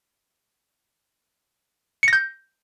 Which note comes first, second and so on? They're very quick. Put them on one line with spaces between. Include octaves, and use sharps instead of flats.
C#7 A#6 G6